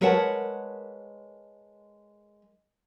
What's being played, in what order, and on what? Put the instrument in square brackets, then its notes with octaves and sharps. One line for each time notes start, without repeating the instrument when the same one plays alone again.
[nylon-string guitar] G#3 A#4 B4 C#5 F#5 A5